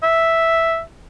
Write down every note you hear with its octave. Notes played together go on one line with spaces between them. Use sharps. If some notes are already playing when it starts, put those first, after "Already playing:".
E5